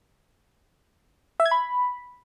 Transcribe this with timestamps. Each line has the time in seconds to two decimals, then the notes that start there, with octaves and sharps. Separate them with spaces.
1.40 E5
1.46 G#6
1.51 B5